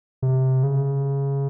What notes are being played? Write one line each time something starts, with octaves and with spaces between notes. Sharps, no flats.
C3
C#3